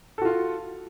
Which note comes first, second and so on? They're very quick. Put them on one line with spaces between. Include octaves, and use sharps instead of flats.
A4 F#4 F4